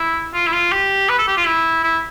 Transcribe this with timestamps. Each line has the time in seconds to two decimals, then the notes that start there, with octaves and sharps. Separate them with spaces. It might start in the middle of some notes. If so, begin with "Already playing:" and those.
Already playing: E4
0.34 F4
0.47 E4
0.53 F4
0.72 G4
1.09 B4
1.19 A4
1.28 G4
1.37 F4
1.46 E4
1.84 E4